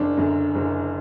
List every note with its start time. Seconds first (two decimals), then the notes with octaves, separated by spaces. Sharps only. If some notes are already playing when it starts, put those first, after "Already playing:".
Already playing: F#1 D4
0.17 F#2 D3
0.55 F#1